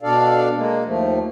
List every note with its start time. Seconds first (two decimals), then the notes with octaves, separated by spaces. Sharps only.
0.03 B2 D4 A4 D5 F5
0.55 G#3 A#3
0.86 D#2 F3 A3